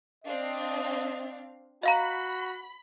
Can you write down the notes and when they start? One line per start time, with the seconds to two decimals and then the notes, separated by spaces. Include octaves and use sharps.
0.24 C4 D4 D#5 F5
1.83 F#4 D#5 F5 A#5 B5